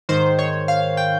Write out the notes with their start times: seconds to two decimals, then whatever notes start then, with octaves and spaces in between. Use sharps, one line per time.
0.09 G#2 D#3 C5
0.39 C#5
0.68 F5
0.97 G5